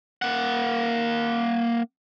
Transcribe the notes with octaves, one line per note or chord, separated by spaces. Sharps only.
A#3 F#5